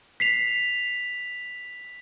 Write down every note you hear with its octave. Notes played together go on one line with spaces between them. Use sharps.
B6 C7 F7